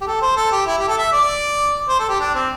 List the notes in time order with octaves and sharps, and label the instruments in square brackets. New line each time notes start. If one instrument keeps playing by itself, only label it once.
[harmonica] G4
A4
C5
A4
G4
E4
G4
A4
E5
D5
C5
A4
G4
D4
C4